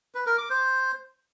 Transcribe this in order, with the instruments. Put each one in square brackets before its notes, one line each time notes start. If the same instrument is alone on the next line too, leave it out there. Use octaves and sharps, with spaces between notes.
[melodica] B4
A#4
D6
C5